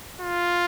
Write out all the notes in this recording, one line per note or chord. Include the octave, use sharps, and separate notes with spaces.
F4